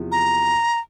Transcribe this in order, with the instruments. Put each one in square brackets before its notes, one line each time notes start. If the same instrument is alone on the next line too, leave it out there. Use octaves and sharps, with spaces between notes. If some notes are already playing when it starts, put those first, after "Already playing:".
Already playing: [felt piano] E2 C3 F3
[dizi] A#5